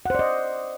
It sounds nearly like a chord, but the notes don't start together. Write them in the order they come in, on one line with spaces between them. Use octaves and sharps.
F#5 C5 D5 D#5